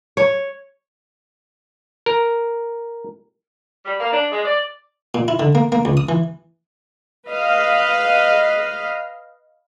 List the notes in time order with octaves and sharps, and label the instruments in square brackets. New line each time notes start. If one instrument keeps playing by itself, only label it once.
[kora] C#5
[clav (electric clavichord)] A#4
[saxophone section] G3
A#3
D4
G#3
D5
[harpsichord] A#2
E4
D3
A#3
A#3
C#2
D#6
E3
[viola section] B4 D#5 F5